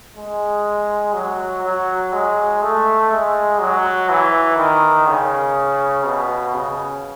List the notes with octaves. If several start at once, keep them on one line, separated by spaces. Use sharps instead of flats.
G#3
F#3
F#3
G#3
A3
G#3
F#3
E3
D#3
C#3
B2
C#3